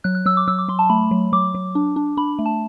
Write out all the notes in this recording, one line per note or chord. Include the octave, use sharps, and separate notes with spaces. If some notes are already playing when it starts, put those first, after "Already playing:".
F#3 F#6
F#6
F#3 E6
D6
F#3 E6
D6
F#3 C6
A5
A3 B5
F#3
F#3 D6
F#3
D4
D4
D4 B5
A3
A5